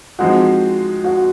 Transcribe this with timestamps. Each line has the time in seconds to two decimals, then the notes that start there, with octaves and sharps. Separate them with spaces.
0.19 F3 G#3 C4 D#4 F#4 F#5
1.04 F#4 F#5